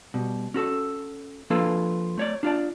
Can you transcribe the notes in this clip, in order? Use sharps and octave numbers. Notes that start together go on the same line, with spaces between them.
B2 G3
C#4 F#4 A4
F3 A#3 D4 F4 A4 B4
A3 C#5 D5
D4 F4 F#4 D5 A5